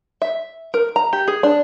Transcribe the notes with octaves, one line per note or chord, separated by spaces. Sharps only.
E5
A#4
A#5
G4
G#4
D4